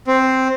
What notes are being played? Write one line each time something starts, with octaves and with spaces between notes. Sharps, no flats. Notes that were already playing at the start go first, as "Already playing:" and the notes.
C4